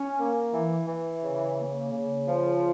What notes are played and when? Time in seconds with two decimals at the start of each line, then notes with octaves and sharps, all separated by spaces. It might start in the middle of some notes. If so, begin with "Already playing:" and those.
Already playing: C#4
0.17 A#3
0.52 E3
0.87 E3
1.23 C#3
1.57 A#3
1.92 C#3
2.27 F3